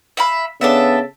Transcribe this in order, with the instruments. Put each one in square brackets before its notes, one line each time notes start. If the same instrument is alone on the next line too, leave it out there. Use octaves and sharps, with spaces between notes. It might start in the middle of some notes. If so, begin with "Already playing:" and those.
[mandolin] E5 F5 B5
[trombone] C#3 [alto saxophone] B3 [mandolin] D4 A4 E5